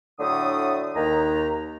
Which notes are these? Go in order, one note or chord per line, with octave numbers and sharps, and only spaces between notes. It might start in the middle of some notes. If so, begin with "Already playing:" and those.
A2 D3 F#3 A3 D#6
D#2 A#5